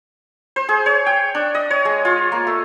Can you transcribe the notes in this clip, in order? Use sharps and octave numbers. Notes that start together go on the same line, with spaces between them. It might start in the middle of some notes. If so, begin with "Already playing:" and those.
C5
G#4
C#5
G5
D4
D#5
C#5
G#3
F4
A#3
A3